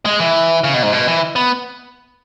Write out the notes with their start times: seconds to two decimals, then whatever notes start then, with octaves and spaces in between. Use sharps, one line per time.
0.05 G#3
0.20 E3
0.64 C#3
0.74 B2
0.83 G#2
0.93 B2
1.08 E3
1.36 B3